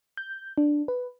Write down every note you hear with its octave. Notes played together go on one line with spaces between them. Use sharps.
G6
D4
B4